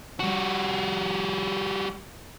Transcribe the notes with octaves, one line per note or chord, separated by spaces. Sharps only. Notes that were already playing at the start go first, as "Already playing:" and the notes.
G3 F#4